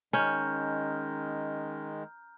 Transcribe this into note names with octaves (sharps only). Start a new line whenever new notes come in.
D#3 G#3 C#4 A#5 F6 G6